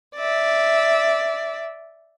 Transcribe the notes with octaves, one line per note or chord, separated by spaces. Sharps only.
D5 E5